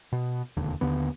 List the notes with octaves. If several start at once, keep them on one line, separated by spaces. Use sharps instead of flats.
B2
E1 D#2 D3
D#2 D3 B3